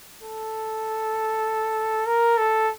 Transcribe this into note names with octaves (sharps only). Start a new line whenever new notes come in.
A4
A#4
A4